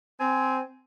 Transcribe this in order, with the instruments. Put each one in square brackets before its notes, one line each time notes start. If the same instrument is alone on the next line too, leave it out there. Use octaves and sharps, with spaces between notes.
[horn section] C4 G#5